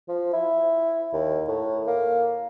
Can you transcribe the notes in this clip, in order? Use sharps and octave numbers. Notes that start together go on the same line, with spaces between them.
F3
E4
D#2
A2
A#3